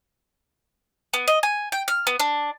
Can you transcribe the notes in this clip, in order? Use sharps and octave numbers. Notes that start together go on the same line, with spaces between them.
B3
D#5
G#5
G5
F6
B3
D4